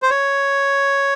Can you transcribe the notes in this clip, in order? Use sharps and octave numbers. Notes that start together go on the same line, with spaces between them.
C5
C#5